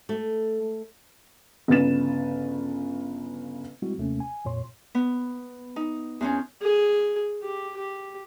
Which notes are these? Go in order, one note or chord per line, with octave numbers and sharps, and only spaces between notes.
A3
G1 C#3 B4 A6 E7
G3 G#3 C4 E4 F#4
D#2 C3 A3 A#3 C#4
G#5
F2 A#2 C#5 C6
B3
D#4
E2 C4 C#4
G#4
G4
G4